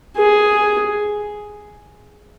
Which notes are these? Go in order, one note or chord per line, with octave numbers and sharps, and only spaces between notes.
G#4